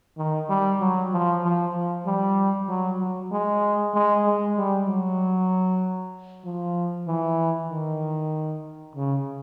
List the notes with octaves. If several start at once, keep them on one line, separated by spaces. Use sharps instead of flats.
D#3
G3
F#3
F3
F3
F3
G3
F#3
F#3
G#3
G#3
G#3
G3
F#3
F3
E3
D#3
C#3